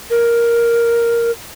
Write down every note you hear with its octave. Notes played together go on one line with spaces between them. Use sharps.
A#4